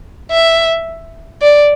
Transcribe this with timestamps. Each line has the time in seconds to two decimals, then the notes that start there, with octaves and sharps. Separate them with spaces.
0.31 E5
1.42 D5